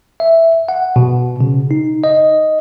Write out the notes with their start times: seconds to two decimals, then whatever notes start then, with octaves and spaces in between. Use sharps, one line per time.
0.20 E5
0.69 F#5
0.96 B2
1.41 C#3
1.71 D#4
2.04 D#5